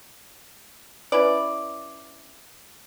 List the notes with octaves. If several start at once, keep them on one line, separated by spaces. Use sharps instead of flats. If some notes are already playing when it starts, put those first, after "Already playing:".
C#4 E4 B4 D5